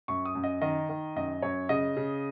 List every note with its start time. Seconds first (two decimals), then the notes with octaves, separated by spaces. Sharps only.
0.08 F#2 C#6
0.25 D#6
0.35 F#2
0.44 D#5
0.61 D#3 D#5
0.89 D#3
1.16 F#2 D#5
1.42 F#2 C#5
1.69 C#3 D#5
1.97 C#3